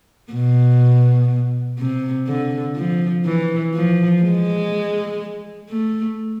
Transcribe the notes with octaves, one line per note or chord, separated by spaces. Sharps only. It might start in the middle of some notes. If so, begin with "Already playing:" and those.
B2
C3
D3
F3
E3
F3
G#3
A3